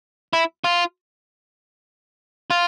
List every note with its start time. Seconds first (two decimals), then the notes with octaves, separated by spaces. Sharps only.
0.33 E4
0.64 F4
2.50 F4